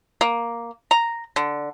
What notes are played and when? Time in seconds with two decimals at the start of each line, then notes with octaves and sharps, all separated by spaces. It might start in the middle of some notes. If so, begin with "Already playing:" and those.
0.21 A#3
0.91 A#5
1.36 D3